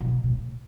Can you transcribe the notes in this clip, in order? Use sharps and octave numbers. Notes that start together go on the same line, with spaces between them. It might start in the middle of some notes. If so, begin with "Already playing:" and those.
B2
A2